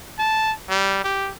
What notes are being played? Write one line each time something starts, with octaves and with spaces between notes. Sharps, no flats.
A5
G3
G4